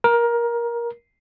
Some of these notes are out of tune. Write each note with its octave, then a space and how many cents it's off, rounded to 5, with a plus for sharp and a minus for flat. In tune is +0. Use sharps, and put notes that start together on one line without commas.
A#4 +20